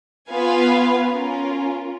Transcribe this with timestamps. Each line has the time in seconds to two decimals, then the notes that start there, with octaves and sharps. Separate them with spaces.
0.31 B3 F4 B4 F5 G#5
1.11 C#4 F4 A#4